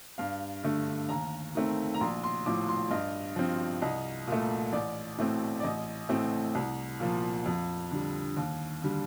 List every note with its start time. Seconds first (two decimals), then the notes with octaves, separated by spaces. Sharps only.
0.18 G2 F5
0.64 D3 A3
1.09 D#2 A#5
1.55 D#3 A3 C4
1.94 A#5
2.01 A#1 C6
2.24 C6
2.46 A2 F3 D6
2.69 C6
2.91 G2 D#5
3.36 F3 C4
3.82 C2 D#5
4.28 A#2 A3
4.73 A1 D5
5.18 A2 A3 C4
5.60 D5
5.63 A1 D#5
6.09 A2 A3 C4
6.55 C2
7.00 A#2 F3
7.46 F2
7.91 D3 G3
8.37 D#2
8.82 D3 G3